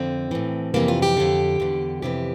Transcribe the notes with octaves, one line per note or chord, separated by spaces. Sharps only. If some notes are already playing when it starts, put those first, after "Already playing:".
Already playing: F2 D3 C4
A2 E3
F2 C3 E3 A#3
F4
G4
F2 D3
E2 D3
F2 C3 E3 G4